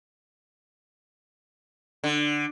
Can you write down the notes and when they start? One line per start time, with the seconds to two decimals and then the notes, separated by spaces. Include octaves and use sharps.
2.04 D3